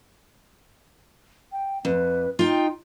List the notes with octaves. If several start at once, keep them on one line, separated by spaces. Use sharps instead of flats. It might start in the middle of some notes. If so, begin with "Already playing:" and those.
G5
F2 B4
D#4 F4 G5